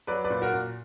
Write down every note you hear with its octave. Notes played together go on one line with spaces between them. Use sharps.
F#3 B4 D5
B4 D5
A#2
F#4 A#4
A#2